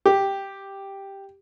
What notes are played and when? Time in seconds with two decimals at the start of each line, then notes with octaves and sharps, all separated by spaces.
0.06 G4